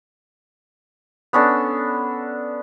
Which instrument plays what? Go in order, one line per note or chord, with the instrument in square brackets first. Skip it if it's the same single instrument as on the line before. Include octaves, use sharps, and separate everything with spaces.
[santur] B3 C#4 D4 A4